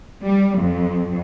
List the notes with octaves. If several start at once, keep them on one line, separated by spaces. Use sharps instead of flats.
G3
F2